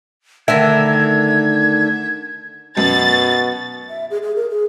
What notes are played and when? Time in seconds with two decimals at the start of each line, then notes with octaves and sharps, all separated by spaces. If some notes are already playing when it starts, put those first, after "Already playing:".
0.48 D3 D#3 A3 A#4 E5 G#6
2.77 F#2 B2 A6
3.90 E5
4.11 G#4
4.22 G#4
4.36 A#4
4.50 G#4